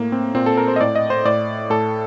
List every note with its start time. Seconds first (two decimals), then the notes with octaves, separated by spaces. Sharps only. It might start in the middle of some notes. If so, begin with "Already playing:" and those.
Already playing: A2 A#3
0.12 C4
0.35 A#2 C4
0.46 A4
0.58 A#4
0.68 C5
0.76 D#5
0.81 A2 D5
0.95 D#5
1.10 C5
1.25 A2 D5
1.70 A2 A4